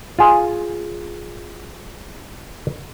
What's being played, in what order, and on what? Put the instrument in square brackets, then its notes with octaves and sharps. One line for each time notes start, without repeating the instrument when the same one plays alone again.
[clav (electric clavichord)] F4 G#4